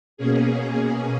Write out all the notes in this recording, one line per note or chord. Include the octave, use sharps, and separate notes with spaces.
B2 A#3 C#4 G#4